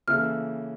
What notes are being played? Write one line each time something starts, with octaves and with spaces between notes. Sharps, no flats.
C#3 E3 A#3 E4 A4 F6